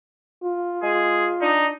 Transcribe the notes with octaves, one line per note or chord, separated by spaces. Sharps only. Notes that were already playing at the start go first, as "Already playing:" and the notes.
F4
G#3 G#4
D4 D#4